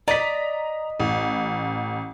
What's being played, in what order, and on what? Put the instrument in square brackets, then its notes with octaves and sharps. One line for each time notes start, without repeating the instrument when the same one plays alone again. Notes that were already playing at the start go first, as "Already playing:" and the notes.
[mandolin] D5 D#5 [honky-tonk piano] A#5 B6
[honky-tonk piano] A1